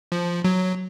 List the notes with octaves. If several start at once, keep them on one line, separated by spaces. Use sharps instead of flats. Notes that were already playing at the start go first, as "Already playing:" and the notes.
F3
F#3